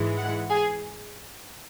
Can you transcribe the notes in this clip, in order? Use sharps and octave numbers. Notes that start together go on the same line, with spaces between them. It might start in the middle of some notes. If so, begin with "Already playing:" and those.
Already playing: G#2 E3 G#3
F#5
G#4